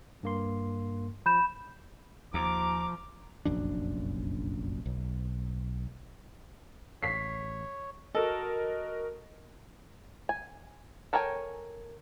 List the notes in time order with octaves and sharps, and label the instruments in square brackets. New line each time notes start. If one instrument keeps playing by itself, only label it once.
[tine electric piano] G2 A#3 C6
[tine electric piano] F3 [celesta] B5 G6 E7
[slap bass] D#2 [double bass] F3 [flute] A#5 [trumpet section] D6
[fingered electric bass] F1 A#1 F#2 D4
B1
[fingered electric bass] A1 [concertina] C#5 [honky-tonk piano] B6 C7
[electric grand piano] F#4 A#4 D#5 [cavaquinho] A4
[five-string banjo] G#5
A4 A#4 C#5 G5 G#5